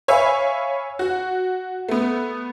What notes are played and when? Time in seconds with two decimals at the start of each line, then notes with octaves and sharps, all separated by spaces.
0.08 C#5 E5 F5 G#5 B5
0.99 F#4
1.89 A3 B3